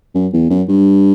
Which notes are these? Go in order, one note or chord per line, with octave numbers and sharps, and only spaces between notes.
F#2
E2
F#2
G2